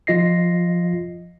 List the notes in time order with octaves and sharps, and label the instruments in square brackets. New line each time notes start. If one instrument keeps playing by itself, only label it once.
[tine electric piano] F3 F4 D#5 A#6 C7